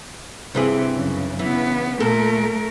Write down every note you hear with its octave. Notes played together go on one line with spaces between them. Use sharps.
G2 C3 E3 C4 G#4
F#2 C#3
C#3 E3 B3
A#2 A3 A4 A#4